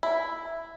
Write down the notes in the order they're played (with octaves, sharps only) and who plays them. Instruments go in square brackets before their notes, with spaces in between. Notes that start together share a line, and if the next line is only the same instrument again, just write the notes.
[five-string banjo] E4